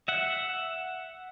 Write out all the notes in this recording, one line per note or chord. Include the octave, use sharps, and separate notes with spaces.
E5 F#5